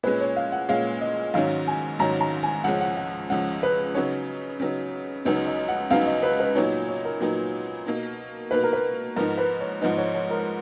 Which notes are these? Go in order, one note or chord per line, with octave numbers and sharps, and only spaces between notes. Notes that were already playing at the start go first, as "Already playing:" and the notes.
A#2 G#3 C#4 B4
C#5
F5
F#5
A#2 G#3 C#4 F5
D#5
G#2 D#3 F#3 C#4 F5
G#5
G#2 D#3 F#3 C#4 A#5
A#5
G#5
C#2 C#3 F3 G#3 C#4 F#5
F#5
F#5
C#2 C#3 F3 G#3 C#4 F#5
B4
C#3 F#3 B3 D#4 C#5
C#3 F#3 B3 D#4
C#2 C#3 F#3 B3 D#4 D#5
D#5
F#5
C#2 C#3 F#3 B3 D#4 F5
D#5
B4
B4
A#2 F#3 B3 D#4 C#5
C#5
A#4
A#2 F#3 B3 D#4
B2 A#3 D#4
B2 A#3 D#4 B4
A#4
B4
G#2 F3 B3 D#4 A#4
B4
C#5
G#2 F3 B3 D#4 D#5
C#5
C#5
A#4